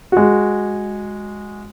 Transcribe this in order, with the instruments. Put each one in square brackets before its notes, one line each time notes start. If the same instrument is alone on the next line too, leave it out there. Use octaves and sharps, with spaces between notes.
[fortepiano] G#3 F#4